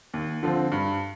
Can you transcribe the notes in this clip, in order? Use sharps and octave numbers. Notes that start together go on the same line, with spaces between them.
D#2
D3 F3 C4
G2